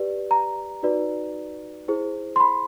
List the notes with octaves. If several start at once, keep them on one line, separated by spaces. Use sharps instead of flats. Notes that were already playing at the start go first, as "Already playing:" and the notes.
Already playing: G4 B4 D5
A#5
D#4 F#4 B4 D5
E4 G#4 C5
C6
B5